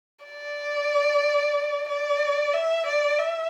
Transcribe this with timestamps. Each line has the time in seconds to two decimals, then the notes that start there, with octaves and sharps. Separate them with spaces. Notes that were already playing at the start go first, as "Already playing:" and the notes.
0.26 D5
1.89 D5
2.53 E5
2.86 D5
3.19 E5